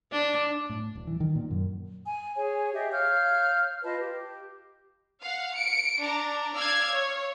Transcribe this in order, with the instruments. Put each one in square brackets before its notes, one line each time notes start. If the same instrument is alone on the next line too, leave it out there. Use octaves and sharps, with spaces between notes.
[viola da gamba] D4
[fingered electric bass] A2
D#1
E3
D#3
A#2
F#2
[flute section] G#5
G#4 C#5 G#5
G4 G#4 D#5 E5
C#5 F5 F6 G6
F4 B4 D#5 A5
G4
[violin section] F5 F#5
C#7 D7
D4 A#5
D5 F5 E6 F6 G#6
C#5